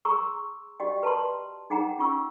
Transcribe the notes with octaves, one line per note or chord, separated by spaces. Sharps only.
G#4 A#5 C6 C#6 E6
F#4 G4 D5 D#5 G5
B4 A5 A#5 C6
D#4 G#4 F#5 G5 A#5
C#4 F4 C#6 E6